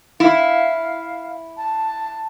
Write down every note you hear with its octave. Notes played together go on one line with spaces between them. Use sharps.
E4 F5
A5